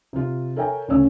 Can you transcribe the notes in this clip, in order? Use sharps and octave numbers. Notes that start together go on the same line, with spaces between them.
C3 F4
A4 A#4 C#5 E5 G5 G#5
D2 C#3 C#4 C#5 E6